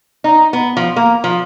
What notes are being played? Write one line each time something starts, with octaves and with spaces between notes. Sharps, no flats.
D#4
B3
F3
A#3
F3